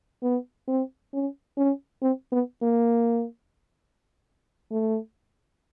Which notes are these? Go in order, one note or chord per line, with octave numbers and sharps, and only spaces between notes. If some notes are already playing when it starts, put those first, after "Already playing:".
B3
C4
C#4
C#4
C4
B3
A#3
A3